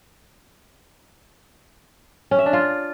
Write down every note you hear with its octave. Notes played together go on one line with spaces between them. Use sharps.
C#4
E5
D4
F4